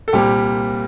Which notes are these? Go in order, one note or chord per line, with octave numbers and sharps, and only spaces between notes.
A4
C2 A#2 G3 C4 G4